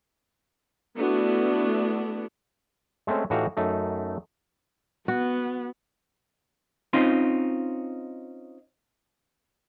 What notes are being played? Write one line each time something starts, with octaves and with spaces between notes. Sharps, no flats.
A3 B3 D4 E4 F#4
G#3 A3 C4 C#4
A2 E3 D#4 F#4 G4 F5
F#2 A3 D#4
B3 F#4
C4 C#4 D#4 F4